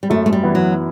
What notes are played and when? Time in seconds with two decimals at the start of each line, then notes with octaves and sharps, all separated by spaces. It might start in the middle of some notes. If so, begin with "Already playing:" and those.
0.03 G3
0.10 F#2 A3
0.26 A3
0.33 G3
0.43 E3 B3 E4
0.55 F#3